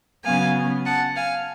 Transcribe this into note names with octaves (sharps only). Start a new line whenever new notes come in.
C#3 F#3 B3 F5 G#5
F#5 A5
F5 G#5